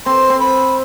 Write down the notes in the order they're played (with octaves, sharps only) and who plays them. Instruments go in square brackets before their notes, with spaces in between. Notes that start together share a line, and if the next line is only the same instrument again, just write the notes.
[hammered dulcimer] C4 [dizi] C6
[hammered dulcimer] C4
[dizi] B5